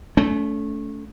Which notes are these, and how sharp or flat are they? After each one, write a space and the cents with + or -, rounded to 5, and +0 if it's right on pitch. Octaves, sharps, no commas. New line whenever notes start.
A3 -10 C#4 +35